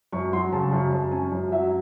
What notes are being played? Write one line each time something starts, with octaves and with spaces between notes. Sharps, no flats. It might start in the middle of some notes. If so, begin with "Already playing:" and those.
F#2 C#6
F#3 C6
C#3 A5
F#2 C#6
F#2 A5
C#4 G#5
F#2
F#3 E5